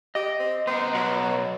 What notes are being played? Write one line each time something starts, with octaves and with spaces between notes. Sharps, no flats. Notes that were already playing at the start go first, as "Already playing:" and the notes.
G4 D#5
C4
B3 A#4 C5
B1 F#4